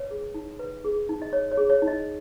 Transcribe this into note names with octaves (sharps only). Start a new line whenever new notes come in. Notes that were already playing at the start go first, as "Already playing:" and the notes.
Already playing: B4 C#5
G#4
D#4
B4
G#4
D#4
D#5
C#5
C#5
G#4
C#5
D#4
D#5